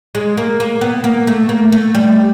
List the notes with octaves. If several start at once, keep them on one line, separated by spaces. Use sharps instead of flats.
G#3
A#3
A#3
B3
A#3
A3
A#3
A3
G3